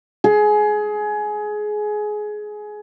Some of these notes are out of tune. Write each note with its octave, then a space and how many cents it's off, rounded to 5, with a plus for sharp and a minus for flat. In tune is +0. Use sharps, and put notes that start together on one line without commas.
G#4 +20